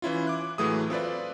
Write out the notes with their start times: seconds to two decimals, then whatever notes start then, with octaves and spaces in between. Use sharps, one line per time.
0.02 E3 C#4 E4 F4
0.27 D6 F#6
0.58 A2 E3 F#3 A3 G#4 D#6
0.90 C4 F4 B4 D5